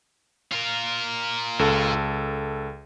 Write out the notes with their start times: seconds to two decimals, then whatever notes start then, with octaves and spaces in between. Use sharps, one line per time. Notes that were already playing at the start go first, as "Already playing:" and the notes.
0.51 F4 A#4
1.59 C#2 A4